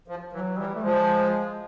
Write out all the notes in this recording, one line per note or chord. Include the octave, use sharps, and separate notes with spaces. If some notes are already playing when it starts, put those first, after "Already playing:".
F3
E3 F#3
E3 G3
A3
F3 G#3